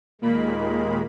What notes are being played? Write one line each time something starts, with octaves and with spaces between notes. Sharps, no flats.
D#2 A#2 D#3 G#3 A#3 B5